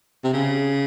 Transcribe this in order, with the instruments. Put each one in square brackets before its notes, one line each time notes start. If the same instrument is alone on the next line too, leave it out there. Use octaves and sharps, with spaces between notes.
[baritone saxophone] C3
C#3